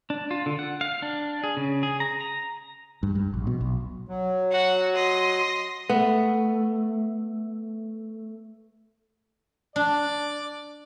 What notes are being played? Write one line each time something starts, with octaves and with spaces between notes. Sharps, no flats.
D4
F4
D3
F#5
F5
D4
G#4
C#3
G#4
A#5
A#5
G2
G2
A#1
B2
B1
F#3
F#4 F#5
D#5 C6
A3 B3
D4 D5